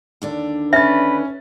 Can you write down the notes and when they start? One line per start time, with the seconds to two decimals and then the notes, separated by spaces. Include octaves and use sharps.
0.22 D#2 D3 D4
0.73 C#4 B4 E5 A6